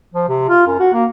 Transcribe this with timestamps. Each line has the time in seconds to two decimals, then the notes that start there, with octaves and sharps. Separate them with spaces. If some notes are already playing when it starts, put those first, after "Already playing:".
0.14 F3
0.28 C3
0.49 F4
0.67 F#2
0.79 F#4
0.93 A#3